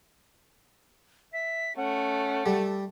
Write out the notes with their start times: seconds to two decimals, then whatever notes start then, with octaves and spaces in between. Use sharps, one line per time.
1.33 E5 B6
1.77 A3 C#4 F#5
2.46 G3 A4